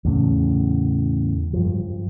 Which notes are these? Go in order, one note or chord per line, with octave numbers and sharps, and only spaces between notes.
E2 A2 C#3
G2 F3